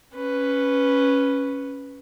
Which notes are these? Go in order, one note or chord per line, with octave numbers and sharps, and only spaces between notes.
C#4 B4